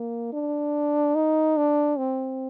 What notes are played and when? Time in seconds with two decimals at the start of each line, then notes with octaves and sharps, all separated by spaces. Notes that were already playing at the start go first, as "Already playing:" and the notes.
Already playing: A#3
0.33 D4
1.16 D#4
1.57 D4
1.98 C4